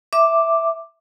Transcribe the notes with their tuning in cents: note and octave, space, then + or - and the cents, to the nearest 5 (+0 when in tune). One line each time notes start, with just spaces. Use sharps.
E5 +0 D6 +0